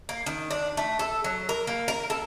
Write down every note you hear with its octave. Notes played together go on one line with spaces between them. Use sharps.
A#3
D#3
D4
A3
A4
F#3
A#4
A#3
A#4
A4